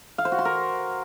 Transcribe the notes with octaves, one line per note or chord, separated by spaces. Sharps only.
F5
C5
F#4
C6
A#4